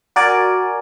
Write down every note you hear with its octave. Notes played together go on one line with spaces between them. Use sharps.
F#4 A#4 D5 G#5